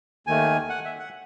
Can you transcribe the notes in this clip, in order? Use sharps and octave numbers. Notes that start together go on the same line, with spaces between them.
D#2 D#3 A3 G#5
F#5
E5
F#5